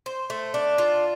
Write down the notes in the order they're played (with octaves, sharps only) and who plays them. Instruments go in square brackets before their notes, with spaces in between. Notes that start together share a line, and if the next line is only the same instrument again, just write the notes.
[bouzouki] C5
A3
D4
F4